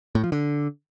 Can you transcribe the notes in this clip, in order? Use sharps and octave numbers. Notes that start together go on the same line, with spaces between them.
A2
F3
D3